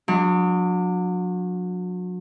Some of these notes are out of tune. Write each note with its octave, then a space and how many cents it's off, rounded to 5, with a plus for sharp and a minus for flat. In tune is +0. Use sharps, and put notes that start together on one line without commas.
F#3 -35 D4 +0